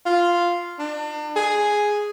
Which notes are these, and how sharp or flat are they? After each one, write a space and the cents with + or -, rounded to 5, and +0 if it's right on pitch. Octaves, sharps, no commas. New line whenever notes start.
F4 -5
D4 +35
G#4 +0